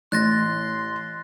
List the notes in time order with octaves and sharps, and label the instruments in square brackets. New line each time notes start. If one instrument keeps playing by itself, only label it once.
[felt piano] A1 [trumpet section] C6 [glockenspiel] F#6 A6 A#6